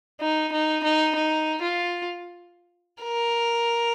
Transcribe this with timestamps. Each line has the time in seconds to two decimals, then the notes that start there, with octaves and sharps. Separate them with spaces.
0.21 D#4
0.53 D#4
0.84 D#4
1.16 D#4
1.63 F4
3.04 A#4